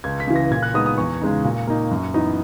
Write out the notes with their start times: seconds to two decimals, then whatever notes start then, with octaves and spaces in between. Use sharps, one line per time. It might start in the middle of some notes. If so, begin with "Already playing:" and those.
0.04 C#2 G#6
0.20 B6
0.27 C#3 E3
0.36 A#6
0.51 A#2 G#6
0.63 F#6
0.74 G#3 B3 D#4 D#6
0.86 D#6
0.98 E2 C#6
1.21 C#3 G#3 D#4
1.44 A#2
1.67 A#3 D#4
1.91 F#2
2.14 E3 B3 D#4